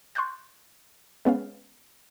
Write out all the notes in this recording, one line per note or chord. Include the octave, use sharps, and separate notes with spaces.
C6 C#6 D#6 F#6 G6 A6
G#3 B3 C#4 F5